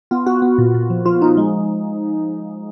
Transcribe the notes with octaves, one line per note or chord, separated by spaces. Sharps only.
B3 F4
B3 F#4
B3
A#2
A#2
F3
F3 F4
F3 D#4
G#3